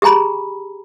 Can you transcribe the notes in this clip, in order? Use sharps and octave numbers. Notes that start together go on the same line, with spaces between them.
G4 G#4 G#5 A#5 B5